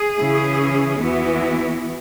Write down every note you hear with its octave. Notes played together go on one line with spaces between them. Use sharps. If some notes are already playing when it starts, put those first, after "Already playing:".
Already playing: G#4
C#3 E3 C#4 E4
E2 E3 B3 E4 F#4